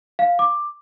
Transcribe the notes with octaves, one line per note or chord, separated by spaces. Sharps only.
F5
D6